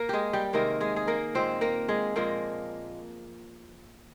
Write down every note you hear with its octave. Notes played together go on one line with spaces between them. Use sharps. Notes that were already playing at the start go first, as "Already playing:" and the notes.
Already playing: A#3 A#4
G#3 G4 G#4
G3 G4
C3 D#3 G#3 A#3 A#4
G#3 G#4
G#4
A#3 A#4
A#2 G#3 C4 C5
A#3 A#4
G#3 G#4
A#2 F3 G#3 A#3 A#4